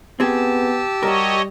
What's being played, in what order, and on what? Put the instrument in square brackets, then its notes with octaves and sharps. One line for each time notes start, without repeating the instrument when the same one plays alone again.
[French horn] B3 [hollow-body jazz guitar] C4 G#4 [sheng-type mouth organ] G4 A5 E6
[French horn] G3 [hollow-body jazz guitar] F#4 A#4 [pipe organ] C#5 D#5